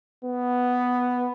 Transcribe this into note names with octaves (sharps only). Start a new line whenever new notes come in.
B3